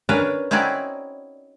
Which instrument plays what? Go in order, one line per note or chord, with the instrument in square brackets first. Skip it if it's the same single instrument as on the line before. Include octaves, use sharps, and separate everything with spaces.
[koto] C#4 D4 A#4 B4 C#5
C4 C#4 D#4 E4 F#4 D5